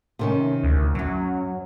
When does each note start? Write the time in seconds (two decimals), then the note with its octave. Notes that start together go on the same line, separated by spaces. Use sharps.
0.19 C3 D#3 C#4
0.63 D2
0.95 F#2 F#3 C#4